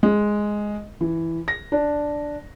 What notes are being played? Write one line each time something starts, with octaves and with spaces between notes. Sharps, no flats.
G#3
E3
A#6
D4